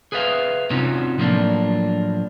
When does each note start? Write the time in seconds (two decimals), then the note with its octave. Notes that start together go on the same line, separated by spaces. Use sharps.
0.12 G#4 B4 C5 E5 F5
0.70 C3 C4 C#4 D#4 F4 F#4
1.18 A2 F3 F#3 A#3 D4